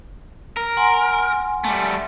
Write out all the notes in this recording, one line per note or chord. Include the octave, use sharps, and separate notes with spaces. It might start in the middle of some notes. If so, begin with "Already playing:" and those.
A#4
F#5 G#5 C6
G3 A3